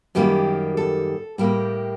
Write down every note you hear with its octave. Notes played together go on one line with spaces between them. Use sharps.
F#2 D#3 G3 A#3 G4
A4
A2 G3 A#3 G4